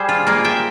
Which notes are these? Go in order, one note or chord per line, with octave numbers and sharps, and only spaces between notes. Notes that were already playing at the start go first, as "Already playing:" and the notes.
Already playing: G3 G#4 C5
F4
A#3 F4 G#4
E5 G5